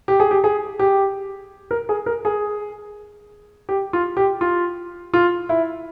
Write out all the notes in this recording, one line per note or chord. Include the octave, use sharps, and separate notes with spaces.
G4
G#4
G4
G#4
G4
A#4
G#4
A#4
G#4
G4
F4
G4
F4
F4
E4